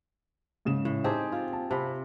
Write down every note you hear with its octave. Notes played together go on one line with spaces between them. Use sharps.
G#2 C#3 E7
A2
C4 D#4 G4 G#4 A5
F4
A5
C3 A5 B5